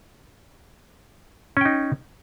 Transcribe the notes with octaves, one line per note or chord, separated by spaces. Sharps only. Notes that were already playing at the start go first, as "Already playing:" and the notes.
C#4 D#4 G5